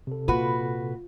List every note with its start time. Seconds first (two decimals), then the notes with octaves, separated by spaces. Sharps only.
0.07 C3 A4
0.28 A#2 F4 F#4 B4